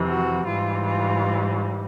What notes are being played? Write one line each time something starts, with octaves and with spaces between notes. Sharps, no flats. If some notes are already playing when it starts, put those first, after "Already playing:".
Already playing: F2 C3 E3
F#4
G#2 E3 G3 F4
F4